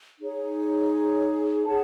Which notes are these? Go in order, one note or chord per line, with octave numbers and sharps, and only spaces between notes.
D#4 G#4 C#5
G#4 C#5 F#5 A5